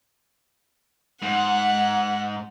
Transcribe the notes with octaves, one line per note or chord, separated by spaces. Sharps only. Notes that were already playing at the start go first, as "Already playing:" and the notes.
G#2 F#5